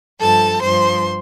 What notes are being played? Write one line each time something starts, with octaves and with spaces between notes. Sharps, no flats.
G2 F3 A4 A5
G2 F3 C5 C6